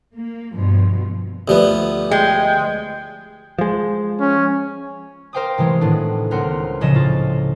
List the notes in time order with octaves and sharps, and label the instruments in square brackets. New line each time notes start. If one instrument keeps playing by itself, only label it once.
[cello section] A#3
G2 B2 F3
[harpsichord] D2 F3 B3 [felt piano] G4 D5
[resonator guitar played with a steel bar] G#3 [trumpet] G5
[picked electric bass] F3 G#3
[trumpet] C#4
[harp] A#4 C5 F5 G5 D6 D#6
C3 E3 G#3 A3
A2 D#3 B3 D4
C#2 B3 A#4 C5 F#5
A#2 C#3 F3 D#5 E7
A2 F4 A6